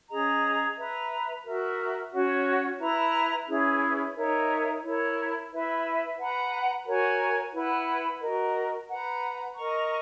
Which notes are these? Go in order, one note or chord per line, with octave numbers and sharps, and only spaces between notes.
C#4 G#4 D#5 A#5
B4 E5 A#5
F#4 A#4 E5
C#4 F#4 C#5
E4 B4 E5 A#5
C#4 E4 G#4 B4
D#4 A#4 C#5 E5
E4 A#4 C#5
E4 B4 E5
B4 F#5 A#5
F#4 A#4 C#5 G#5
E4 B4 F#5
F#4 A#4 D#5
B4 F#5 A#5
A#4 D#5 A#5 C#6